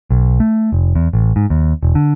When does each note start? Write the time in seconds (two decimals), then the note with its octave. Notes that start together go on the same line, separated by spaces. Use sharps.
0.11 B1
0.40 A3
0.72 F1
0.95 E2
1.13 A1
1.36 G#2
1.50 D#2
1.83 E1
1.95 D3